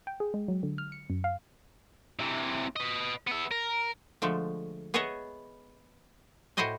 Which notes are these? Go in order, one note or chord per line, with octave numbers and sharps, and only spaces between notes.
G5
G#4
G#3
F#3
D3
F6
C#7
F#2
F5
C3 E3
B4 D#5
B3 E5
A#4
D3 F3 G#3 A3
B3 G#4 B4 C#5 D#5 E5
A2 E4 F#4 C5 D#5 G#5